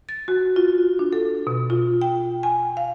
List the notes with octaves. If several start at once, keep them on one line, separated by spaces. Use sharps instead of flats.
A6
F#4
F4
D4
A4
B2
F4
G5
G#5
F5